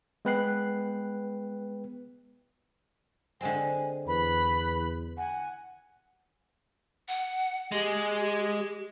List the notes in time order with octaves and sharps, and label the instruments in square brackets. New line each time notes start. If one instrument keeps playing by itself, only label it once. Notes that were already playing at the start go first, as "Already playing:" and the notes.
[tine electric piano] G#3 B3 B4 G5 F#6 C7
[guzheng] D3 G#3 C4 [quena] G#5
[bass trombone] E2 [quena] B4 [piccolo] B5
[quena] F#5 [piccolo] G#5
[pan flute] F#5
[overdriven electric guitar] G#3 [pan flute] G4